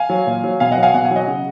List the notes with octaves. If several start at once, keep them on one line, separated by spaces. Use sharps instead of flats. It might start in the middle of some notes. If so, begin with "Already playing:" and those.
Already playing: F5 G#5
F#3
A#2
F#3
B2 F5 G#5
D#5 F#5
F#3
F5 G#5
B2 F#5
G#5
F#3 D#5 F#5
C#3